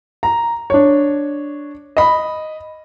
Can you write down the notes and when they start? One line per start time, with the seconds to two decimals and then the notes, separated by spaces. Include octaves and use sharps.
0.23 A#5
0.70 D4 C#5
1.97 D#5 B5